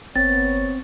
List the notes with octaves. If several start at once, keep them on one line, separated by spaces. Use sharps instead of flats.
G1 B3 C4 C#5 A6